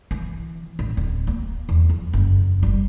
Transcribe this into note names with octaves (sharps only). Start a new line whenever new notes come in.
E3
A1
D1
A#3
E2
F3
F#1
G3